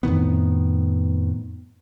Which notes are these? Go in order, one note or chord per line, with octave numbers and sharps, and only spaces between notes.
F2 A2 D#3 B3